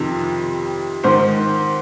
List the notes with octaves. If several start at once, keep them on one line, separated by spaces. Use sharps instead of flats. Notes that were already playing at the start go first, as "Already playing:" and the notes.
Already playing: F2 C3 D#3
G#2 D#3 C5